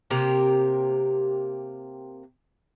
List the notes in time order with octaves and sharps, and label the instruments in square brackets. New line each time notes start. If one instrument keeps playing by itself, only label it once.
[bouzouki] C3 A#3 G4 A#4